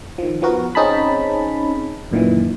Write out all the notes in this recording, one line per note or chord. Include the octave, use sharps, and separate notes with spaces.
D#3 F3
F3 B3 F#4 A#4
C4 C#4 D#4 G#4 A5 B5
F#2 A#2 D#3 E3